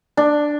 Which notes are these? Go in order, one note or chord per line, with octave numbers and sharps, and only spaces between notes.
D4